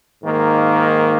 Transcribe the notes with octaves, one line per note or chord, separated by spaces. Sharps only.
G#2 D#3 A#3